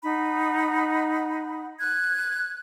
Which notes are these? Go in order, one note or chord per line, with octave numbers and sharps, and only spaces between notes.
D#4 F#5 B5
F#6 G#6